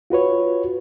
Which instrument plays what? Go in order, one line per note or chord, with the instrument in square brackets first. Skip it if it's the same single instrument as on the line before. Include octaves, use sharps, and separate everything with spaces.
[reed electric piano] F4 F#4 B4 C#5